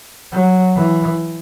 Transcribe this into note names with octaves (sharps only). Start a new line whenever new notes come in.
F#3
E3